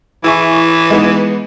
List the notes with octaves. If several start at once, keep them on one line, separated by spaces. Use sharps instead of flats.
E3 E4 G#4 C#6
G#3 B3 D#4